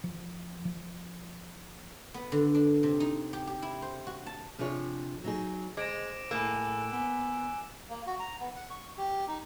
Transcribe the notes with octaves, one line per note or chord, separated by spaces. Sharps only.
F3
F3
B3
D3
D4
C3
D#4
G4
G4
E4
C5
F#4
A5
C3 F3 D4 G#4 C#5
F#3 D#4 G#4
G#3 C5 D6 A#6 D7 E7
A2 A#3 G#4 G#5 B5 E6 F#6 E7
B3 G#5
A#3
F#4
A#5
B3
F#5
C#6
G4
D#4